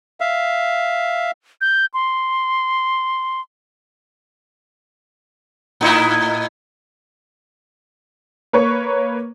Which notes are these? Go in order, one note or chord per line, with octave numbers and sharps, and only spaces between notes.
E5 F5
G6
C6
A2 D#4 E4
A#3 B4 C#5 C#6